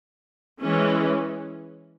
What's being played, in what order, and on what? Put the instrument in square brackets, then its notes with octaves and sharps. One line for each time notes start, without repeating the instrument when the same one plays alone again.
[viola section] E3 G#3 C#4